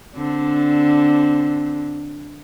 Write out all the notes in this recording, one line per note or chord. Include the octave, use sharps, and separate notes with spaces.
D3 C4 D4